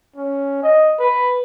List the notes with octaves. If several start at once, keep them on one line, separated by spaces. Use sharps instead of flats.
C#4
D#5
B4